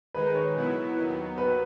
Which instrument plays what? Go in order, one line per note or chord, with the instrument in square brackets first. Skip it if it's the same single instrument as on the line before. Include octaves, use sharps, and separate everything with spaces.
[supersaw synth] D#3 G#3 D#4 [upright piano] B4
[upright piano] C#5
[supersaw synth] B2 F#3 B3 E4
D#2 D#3 F#3 B3
[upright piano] B4